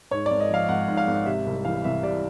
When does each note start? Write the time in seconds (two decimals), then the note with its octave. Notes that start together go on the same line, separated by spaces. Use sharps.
0.11 G#2 C#5
0.26 G#1 D5
0.41 D#5
0.49 F3 F5
0.68 G#1 F#5
0.88 G#2
0.97 F5
1.07 G#1
1.26 C3 E5
1.46 C2
1.65 E3 F5
1.84 C2 E5
2.03 C3 D5